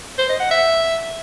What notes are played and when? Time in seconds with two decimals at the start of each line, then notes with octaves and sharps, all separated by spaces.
0.18 C5
0.29 D#5
0.40 F#5
0.51 E5